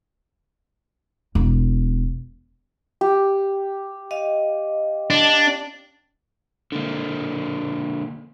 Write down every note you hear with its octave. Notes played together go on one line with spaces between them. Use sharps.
E1
G4
D#5 F5
D4
D3 A#3